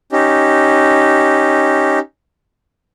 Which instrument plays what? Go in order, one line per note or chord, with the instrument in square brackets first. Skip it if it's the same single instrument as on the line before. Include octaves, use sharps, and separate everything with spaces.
[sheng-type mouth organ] C#4 D#4 G4